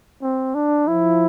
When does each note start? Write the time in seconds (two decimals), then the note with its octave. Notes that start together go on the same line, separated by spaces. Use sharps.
0.22 C4
0.55 D4
0.88 F3 E4